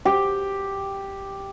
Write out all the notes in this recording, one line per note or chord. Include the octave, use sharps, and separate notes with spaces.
G4